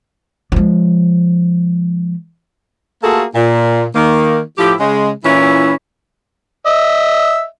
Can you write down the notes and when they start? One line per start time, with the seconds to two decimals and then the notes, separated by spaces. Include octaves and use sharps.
0.52 F3 G#3
3.02 A3 A#3 F4 F#4 G#4 A4
3.35 A#2
3.95 D#3 A#3
4.58 A2 F3 E4 G4
4.80 C#3 G#3
5.24 A#2 E3 C#4 E4
6.66 D#5 E5